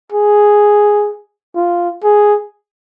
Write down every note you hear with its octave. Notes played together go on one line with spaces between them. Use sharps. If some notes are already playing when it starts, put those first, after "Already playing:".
G#4
F4
G#4